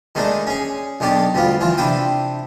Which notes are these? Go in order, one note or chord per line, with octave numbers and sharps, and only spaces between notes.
D#3 G#3 A3 D4 D#4
C#4 G#4
B1 D#3 D4 G4 D5
D2 G3 B3 F4
E3 F3 F4
C3 D4 E4 G5 D#6